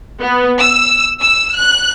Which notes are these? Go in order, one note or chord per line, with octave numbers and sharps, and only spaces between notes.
B3
E6
E6
F#6